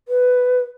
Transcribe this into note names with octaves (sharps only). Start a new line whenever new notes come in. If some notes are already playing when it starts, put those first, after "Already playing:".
B4